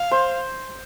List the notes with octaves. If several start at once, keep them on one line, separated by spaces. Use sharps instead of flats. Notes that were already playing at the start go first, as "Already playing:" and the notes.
Already playing: F5
C5